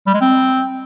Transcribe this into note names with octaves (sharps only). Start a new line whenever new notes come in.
G3
G#3
C4